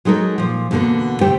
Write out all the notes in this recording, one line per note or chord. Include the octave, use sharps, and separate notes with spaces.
F#3 G#3 D#4 A4 A#4
A#2 F3
E2 B2 D3 A#3 F#4
C3 A3 G4 C5 G5